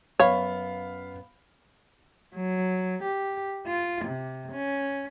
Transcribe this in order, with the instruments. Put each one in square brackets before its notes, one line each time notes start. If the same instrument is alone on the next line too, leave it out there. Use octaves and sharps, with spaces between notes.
[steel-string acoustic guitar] F#2 B3 [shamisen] C#5 [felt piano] F5 B5
[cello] F#3
G4
F4
C3
C#4